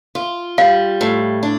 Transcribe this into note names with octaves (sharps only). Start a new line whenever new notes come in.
F4
G3 F5
A2
D4